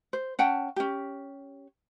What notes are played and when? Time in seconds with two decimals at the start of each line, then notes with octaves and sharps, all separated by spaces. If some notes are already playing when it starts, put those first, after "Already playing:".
0.13 C5
0.39 C#4 F#5 G5 A5
0.76 C#4 G4